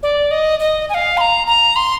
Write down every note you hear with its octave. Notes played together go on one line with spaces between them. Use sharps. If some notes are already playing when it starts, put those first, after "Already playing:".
D5
D#5
D#5
G#5
F5
C6
A#5
A#5
C6